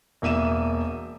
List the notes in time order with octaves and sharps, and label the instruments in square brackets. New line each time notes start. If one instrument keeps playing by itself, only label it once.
[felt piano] E1 A#3 E5 D#7 E7